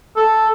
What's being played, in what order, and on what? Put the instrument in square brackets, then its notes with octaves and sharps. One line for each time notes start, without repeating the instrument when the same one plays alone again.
[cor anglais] A4